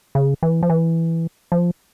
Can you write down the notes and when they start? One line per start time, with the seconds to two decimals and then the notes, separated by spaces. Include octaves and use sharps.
0.15 C#3
0.43 E3
0.63 F3
0.70 E3
1.52 F3